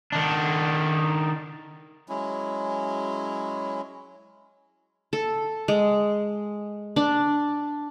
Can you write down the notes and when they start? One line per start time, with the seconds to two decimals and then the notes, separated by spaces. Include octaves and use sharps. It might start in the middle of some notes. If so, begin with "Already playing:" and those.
0.12 D#3 D4
2.09 F#3 G#3 C#4 E4
5.13 A4
5.68 G#3
6.96 D4